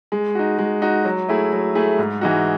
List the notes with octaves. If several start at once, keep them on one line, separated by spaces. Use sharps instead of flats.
G#3
D#4 F#4
G#3
D#4 F#4
F#3
A3 E4 G#4
F#3
A3 E4 G#4
G#2
E3 G#3 D#4 F#4